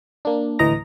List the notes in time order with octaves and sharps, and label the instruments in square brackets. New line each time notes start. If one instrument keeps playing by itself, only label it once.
[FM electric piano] A#3 D4
D2 A2 E3 D#5 A#5 A#6